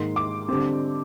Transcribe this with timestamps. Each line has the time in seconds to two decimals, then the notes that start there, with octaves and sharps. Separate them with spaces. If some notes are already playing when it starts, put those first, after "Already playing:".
Already playing: G#2 D#3 A#3 C6
0.16 D6
0.48 D3 G3 C4